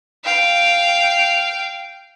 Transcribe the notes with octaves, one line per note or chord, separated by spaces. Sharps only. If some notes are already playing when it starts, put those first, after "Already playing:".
F5 G5